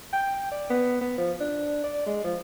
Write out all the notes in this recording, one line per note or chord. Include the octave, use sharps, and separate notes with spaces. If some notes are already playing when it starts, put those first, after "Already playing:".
G5
D5
B3
B3
F3
D4
D5
G#3
F3